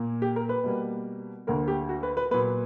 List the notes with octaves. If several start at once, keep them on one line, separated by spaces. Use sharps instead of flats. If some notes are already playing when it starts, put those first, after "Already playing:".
Already playing: A#2 A#3
G4
A#4
B4
B2 G3 A#3
D2 D3 A#3 A#4
G4
F#4
B4
B4
A#2 F#3 B3 B4